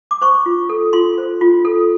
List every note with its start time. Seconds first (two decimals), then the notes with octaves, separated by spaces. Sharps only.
0.11 D6
0.21 C5 C#6
0.46 F4
0.69 A4
0.93 F4 C6
1.18 C5
1.41 F4
1.65 A4